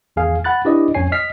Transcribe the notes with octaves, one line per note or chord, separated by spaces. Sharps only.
G#1 E2 G#4 F5 G#5
F#5 B5 F#6 A6
D4 E4 G4 B4 D5 D#5
G#1 F2 C#4 C#5 G#5 C7
D#5 F6 B6 C7